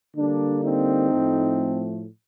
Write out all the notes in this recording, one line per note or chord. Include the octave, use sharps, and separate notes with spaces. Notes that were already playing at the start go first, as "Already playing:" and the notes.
D3 G3 A#3 D4
C4 D#4
A2 F3 A3